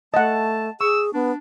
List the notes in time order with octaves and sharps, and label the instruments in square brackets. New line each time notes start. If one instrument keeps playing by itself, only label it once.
[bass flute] A3 [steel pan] D#5 F#5 [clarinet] A5
[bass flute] G#4 [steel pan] C#6 [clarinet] E6
[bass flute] B3 [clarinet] D4